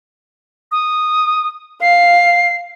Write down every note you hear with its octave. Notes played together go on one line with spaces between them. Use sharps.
D#6
F5 C7